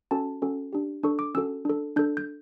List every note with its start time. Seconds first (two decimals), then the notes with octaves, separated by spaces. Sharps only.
0.11 C#4 F#4 A4 A5
0.42 C#4 F#4 A4
0.73 D4 G4
1.03 D4 A4 C#6
1.19 D6
1.35 C#4 F#4 A4 E6
1.65 D4 A4
1.96 D4 A4 G6
2.17 G6